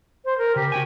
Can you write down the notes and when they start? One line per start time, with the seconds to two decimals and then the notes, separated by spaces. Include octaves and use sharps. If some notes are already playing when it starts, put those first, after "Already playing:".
0.25 C5
0.38 A#4
0.56 C#3 G4
0.72 F#4 G5 G#5